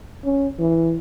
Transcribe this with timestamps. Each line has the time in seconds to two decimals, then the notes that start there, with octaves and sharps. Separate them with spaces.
0.25 C#4
0.59 E3